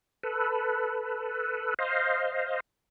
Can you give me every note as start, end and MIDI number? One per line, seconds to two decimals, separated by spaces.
0.23 1.74 69
0.23 1.74 71
1.79 2.60 72
1.79 2.60 75
1.79 2.60 77